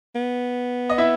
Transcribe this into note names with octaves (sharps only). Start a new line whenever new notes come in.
B3
D#5
E4 E5